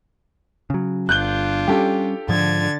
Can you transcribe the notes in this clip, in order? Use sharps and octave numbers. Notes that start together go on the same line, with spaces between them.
C#3 F#3
G1 D4 F4 F#6 G6 G7
G3 C#4 G4 A4 G5
G#2 D3 F3 G#6 A6